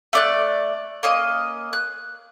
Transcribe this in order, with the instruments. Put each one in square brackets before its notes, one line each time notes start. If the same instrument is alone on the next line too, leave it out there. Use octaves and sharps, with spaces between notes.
[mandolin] A3 D5 F#6
A#3 C#4 D#5
F#6